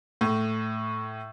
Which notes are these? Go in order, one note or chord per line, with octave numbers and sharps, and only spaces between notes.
A2